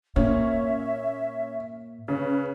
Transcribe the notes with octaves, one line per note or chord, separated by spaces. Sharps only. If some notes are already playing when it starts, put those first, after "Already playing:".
A#2 C#4 E5
C#3 B4